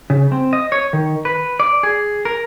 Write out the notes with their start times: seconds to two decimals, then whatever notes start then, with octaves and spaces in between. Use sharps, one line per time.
0.10 C#3
0.32 C4
0.53 D#5
0.72 C#5
0.93 D#3
1.25 B4
1.60 D5
1.83 G#4
2.25 A#4